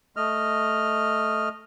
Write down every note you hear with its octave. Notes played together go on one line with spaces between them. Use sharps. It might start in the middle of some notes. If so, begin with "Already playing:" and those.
A3 D#5 F6